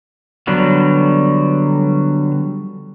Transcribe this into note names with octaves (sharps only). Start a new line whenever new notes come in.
D3 F#3 G3 B3